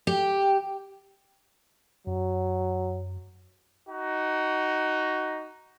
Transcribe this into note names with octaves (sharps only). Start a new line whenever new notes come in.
G4
F#2 F#3
D#4 F#4